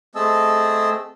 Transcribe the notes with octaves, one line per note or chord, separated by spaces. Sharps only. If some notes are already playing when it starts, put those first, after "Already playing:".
A3 C4 G#4 D#5 A5 E6